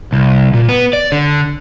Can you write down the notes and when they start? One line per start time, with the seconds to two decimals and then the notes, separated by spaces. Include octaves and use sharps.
0.13 C2
0.54 A#2
0.69 B3
0.93 D5
1.12 D3